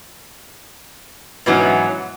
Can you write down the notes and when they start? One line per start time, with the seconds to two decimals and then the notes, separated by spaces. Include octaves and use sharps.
1.46 G#2 B2 E3 F#3 B3 C#4